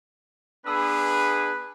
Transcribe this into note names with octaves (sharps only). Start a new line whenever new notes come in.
B3 D4 G#4 B4 B5 D#6 E6